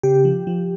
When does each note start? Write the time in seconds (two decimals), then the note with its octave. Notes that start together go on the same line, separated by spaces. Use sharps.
0.03 C#3 G4
0.25 F3
0.47 F3